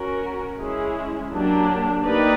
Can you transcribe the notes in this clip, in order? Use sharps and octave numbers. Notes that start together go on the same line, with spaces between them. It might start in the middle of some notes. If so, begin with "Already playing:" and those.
Already playing: C#4 F#4 A#4
G#3 C#4 E4 G#4
F#3 A#3 D4 G4
A#3 D#4 G4 B4 D5